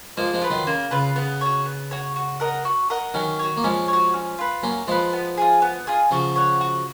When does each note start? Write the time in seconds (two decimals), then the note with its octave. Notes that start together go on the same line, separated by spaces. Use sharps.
0.17 F3 G#3 A#3
0.33 F3 G#3
0.42 F4 B4
0.50 D#3 F#3
0.67 C#3 A#3
0.91 C#3 F4 B4
1.16 C#3 B3
1.41 F#4 C#5
1.66 B3
1.91 F#4 C#5
2.16 F#4
2.40 A#4 D#5 F#5
2.65 F#4
2.90 A#4 D#5 F#5
3.14 D#3 F#3 C#4
3.39 F#4 C#5
3.57 A#3
3.64 F3 G#3 C#4
3.88 F#4 C#5
4.14 C#4
4.39 F4 B4
4.63 F#3 A#3 C#4
4.88 F3 G#3 F4 B4
5.13 B3
5.37 F4 G#4
5.62 B3
5.87 F4 G#4
6.11 C#3 F3 F#4
6.36 C#5 F#5
6.61 F#4